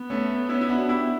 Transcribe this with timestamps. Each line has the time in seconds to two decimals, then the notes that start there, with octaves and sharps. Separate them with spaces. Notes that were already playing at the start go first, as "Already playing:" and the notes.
Already playing: B3
0.10 A3 C#4
0.49 C#4 E4
0.61 E4
0.69 D4 F#4
0.89 E4 G4